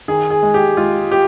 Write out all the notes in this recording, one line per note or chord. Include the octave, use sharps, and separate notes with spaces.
D#3 G#4
G#4
G#3
G4
G#3 F4
G4